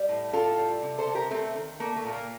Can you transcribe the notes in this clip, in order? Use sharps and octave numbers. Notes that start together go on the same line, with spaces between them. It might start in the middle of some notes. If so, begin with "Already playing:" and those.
Already playing: G3
A2
A2 F4 A4
G3
C3
A4 C5
C3
G4 A#4
C3 A3 C4
D#3
A3 A#3
A3
A#2
A#3